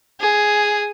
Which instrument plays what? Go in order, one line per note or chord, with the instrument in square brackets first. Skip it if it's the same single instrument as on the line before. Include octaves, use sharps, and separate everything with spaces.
[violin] G#4